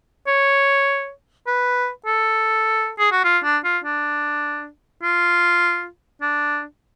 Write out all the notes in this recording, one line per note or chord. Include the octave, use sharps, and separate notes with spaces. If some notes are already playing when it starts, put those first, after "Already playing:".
C#5
B4
A4
G#4
F#4
F4
D4
F4
D4
F4
D4